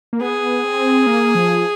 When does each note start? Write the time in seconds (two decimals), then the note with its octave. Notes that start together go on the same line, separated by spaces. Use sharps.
0.13 A#3
0.21 B3 G#4
0.64 C4
1.07 A#3
1.35 F3